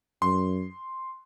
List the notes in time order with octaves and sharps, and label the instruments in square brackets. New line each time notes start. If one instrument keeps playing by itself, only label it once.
[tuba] F#2 [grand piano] C6